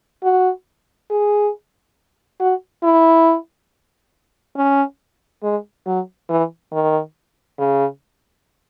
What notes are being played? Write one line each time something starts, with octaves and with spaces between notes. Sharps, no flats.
F#4
G#4
F#4
E4
C#4
G#3
F#3
E3
D#3
C#3